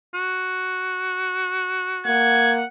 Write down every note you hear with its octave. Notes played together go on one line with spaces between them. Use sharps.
F#4
A#3 F#5 G#6